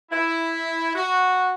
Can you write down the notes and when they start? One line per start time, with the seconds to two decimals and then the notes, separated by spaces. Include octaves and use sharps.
0.11 E4
0.95 F#4